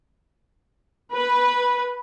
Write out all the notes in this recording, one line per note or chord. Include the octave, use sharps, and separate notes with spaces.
B4